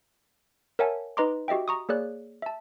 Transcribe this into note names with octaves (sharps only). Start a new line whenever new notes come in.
A#4 C#5 E5 F#5 G#5 A5
D#4 B4 D#5 A#5 C6 D6
F#4 G4 D#5 E5 G5
A#5 C#6 D#6
A#3 G#4 C#5 D5 F#6
E5 A5